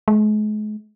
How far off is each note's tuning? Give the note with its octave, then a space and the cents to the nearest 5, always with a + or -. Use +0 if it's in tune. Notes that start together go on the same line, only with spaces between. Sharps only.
G#3 +40